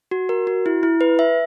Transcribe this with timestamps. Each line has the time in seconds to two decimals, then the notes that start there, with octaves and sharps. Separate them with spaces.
0.11 F#4
0.29 A#4
0.47 F#4
0.66 E4
0.83 E4
1.01 B4
1.19 E5